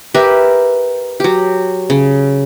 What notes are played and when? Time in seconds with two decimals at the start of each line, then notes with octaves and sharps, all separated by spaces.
0.14 G4 A#4 B4 E5
1.20 F#3 G4
1.90 C#3